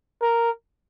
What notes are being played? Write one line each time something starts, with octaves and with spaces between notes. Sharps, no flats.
A#4